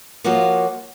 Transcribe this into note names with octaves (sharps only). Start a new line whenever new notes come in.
F3 A#3 F4 F#4 C#5